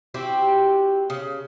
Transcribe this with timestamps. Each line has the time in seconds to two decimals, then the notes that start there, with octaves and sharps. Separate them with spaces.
0.14 C4 E4 F#4 G4
1.10 C#3